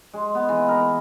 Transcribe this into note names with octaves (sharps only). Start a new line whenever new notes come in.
G#3
B3
E3
A#4